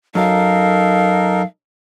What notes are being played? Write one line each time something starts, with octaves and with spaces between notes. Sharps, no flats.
F#2 D#4 A4 A#4 F5